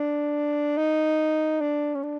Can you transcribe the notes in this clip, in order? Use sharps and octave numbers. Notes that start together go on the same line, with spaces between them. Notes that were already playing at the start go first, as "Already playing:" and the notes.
Already playing: D4
D#4
D4
C#4
D4